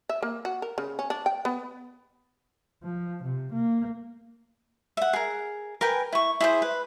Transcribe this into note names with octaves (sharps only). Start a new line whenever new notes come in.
E5
A#3
F#4
A#4
C#3
C#4
D4
G5
B3
F3
C3
A#3
E5 F#5
G#4 A#4
A#4 B4 G5 G#5
E4 C#6
E4 G#4 C5
B4